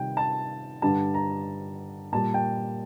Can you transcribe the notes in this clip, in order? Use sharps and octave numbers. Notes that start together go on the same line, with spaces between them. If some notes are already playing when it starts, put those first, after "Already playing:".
Already playing: C3 D#3 G3 G5
A5
G2 D3 G3 A5
A#5
A#2 G3 A5
G5